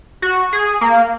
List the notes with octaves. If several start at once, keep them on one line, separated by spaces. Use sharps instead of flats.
F#4
G#4
A#3